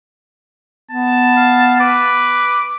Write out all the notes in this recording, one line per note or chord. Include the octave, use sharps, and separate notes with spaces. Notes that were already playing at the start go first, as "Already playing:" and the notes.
B3 A5
F5
B4 D6